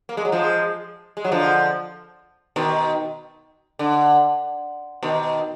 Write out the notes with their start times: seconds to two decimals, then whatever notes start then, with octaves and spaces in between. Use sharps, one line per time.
0.09 A#3
0.17 G#3
0.25 F#3
0.32 F3 G#3
1.17 G#3
1.25 F#3
1.32 D3 F3
2.56 B2 D#3
3.79 D3
5.03 B2 D#3